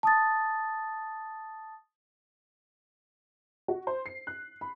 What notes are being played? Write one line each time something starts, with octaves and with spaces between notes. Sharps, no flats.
A5 D#6 A6
F#4
C5
C7
F#6
B5